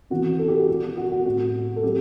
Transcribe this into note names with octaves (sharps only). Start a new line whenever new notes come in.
C3 E3 B3 F#4
A4
G4
F#4
B2 G3 B3 G4
F#4
F#4
A2 G3 C4 F#4
A4
F#3 C4 G4